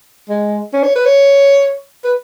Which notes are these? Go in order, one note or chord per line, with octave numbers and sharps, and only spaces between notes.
G#3
C#4
C#5
B4
C#5
B4